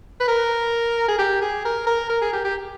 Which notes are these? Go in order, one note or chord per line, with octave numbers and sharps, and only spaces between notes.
B4
A#4
G#4
G4
G#4
A#4
A#4
A#4
G#4
G4
G4